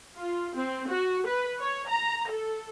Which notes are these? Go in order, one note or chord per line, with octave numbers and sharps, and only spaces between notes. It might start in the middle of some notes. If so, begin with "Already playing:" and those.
F4
C4
F#4
B4
C#5
A#5
A4